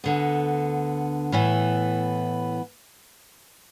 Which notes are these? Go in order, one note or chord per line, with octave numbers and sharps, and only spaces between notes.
D2 D3 B3
A2 E3 B3